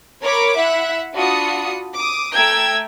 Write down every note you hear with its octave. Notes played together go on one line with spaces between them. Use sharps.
A#4 C#5 B5 D6
E4 E5 F#5
D4 F4 F#4 B5 D#6 C#7
D6 D#6
A3 G5 A#5 E6 G#6